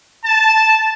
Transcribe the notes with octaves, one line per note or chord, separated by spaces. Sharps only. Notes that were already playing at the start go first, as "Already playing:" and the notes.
A5